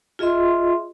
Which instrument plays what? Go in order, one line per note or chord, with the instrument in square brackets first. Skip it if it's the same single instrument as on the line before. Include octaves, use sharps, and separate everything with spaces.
[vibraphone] F4 G#4 D#5 E5 C6